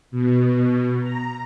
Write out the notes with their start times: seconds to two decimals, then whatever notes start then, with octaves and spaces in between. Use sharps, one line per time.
0.11 B2
1.00 A#5